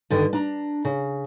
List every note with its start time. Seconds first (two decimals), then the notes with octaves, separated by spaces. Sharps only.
0.10 G2 D3 D#3
0.33 D4 A#5
0.85 C#3